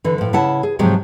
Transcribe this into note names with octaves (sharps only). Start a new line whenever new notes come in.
D3 E3
A2 F3
C#3 E4 F#5 A5
G#4
G#2 C3 F3 F#3 G#3